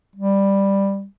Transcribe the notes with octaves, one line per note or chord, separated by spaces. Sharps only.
G3